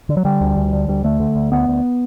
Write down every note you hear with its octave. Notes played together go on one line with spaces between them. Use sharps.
D3
F#3
D3 G3
D2
D2
D3
D2 G3
D3 A3
D3
D2
D2 B3
D2